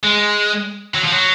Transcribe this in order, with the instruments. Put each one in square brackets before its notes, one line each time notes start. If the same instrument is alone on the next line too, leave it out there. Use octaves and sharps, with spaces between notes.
[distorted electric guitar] G#3
F#3
F3
F#3